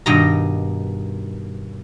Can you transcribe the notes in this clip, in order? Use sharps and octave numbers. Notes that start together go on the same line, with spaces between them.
G2 B2 D#3 D#5 A#5